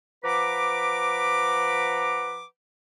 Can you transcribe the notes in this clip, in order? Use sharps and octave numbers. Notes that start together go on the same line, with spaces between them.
F3 B4 F#5 A#5 B5 D6